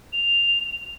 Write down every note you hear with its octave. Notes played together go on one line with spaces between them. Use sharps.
F7